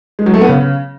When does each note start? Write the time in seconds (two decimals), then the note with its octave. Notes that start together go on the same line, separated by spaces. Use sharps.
0.19 G#3
0.26 F#3
0.34 A3
0.41 B3
0.49 C#3